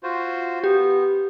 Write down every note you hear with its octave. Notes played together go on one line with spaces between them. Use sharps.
F4 F#4 C5
B3 G4